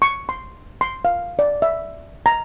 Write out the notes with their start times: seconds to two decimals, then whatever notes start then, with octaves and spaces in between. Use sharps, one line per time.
0.02 C#6
0.29 C6
0.81 C6
1.05 F5
1.39 D5
1.62 E5
2.26 A#5